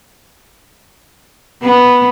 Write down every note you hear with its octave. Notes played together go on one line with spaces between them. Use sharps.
B3